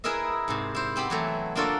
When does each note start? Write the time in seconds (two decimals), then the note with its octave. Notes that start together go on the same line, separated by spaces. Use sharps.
0.04 E4 G#4 A#4 B4 D#5 E5
0.48 G#2 C3
0.75 E4 C5
0.96 B3 C4 G4 B5
1.10 E3 F#3 A3
1.55 A#3 D4 F4 F#4 A4